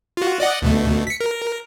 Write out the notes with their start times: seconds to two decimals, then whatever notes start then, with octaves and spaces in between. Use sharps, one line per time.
0.17 F4 F#4
0.40 D5 D#5 F#5
0.62 D2 B2 A3
1.07 B6 C#7
1.21 A#4